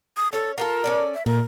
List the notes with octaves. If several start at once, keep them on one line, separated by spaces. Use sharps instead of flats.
D#6
C#4 A4 C#5
F4 F#4 A4 A#4
C#4 A4 D5
E5
A#2 A3 A#4